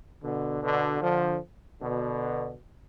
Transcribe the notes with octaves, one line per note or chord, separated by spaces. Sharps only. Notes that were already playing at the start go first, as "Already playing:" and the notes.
B2 D3
B2 D3
D3 F3
B2 D3